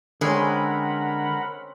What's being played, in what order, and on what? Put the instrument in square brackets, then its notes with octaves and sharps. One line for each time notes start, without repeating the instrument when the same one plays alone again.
[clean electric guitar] D3 [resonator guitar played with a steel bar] G#3 [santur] C4 C#4 G5 [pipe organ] A#4 F#5 B5